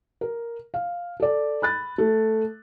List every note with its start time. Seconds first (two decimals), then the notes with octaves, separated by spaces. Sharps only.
0.21 A#4
0.74 F5
1.20 A4 D5
1.62 B5 F#6 A6
1.98 A3